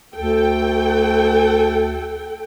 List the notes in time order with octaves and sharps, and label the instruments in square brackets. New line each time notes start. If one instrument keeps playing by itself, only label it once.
[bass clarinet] D2 [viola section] A4 G5